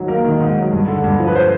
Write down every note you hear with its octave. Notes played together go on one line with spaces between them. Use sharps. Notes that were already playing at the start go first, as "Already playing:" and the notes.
Already playing: G#2 D#3 F#3
A#3 A#4
D#3
G#2
F#3
G2
D3
G2
F3
B4
C5